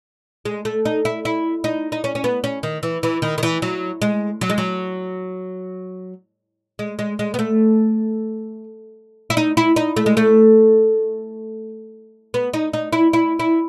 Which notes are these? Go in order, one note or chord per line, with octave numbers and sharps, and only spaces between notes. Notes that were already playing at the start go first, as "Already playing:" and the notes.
G#3
A3
D#4
E4
E4
D#4
D#4
C#4
C#4
B3
C#4
D#3
E3
E3
D#3
D#3
E3
F#3
G#3
F#3
G#3
F#3
G#3
G#3
G#3
B3
A3
E4
D#4
E4
D#4
A3
G#3
A3
B3
D#4
D#4
E4
E4
E4